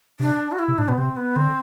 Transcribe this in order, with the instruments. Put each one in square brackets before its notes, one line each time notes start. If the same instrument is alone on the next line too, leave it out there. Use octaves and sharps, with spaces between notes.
[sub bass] C3 [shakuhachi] D4
[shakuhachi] F#4
E4
[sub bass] C3
[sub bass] A2 [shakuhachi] D4
[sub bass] B2 [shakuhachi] B3
[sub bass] C3 [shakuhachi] C4
[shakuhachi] B3
[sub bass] D3 [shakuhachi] C4